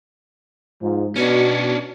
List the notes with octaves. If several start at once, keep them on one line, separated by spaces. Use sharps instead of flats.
G#2 F3
B2 C#4 D4 F#4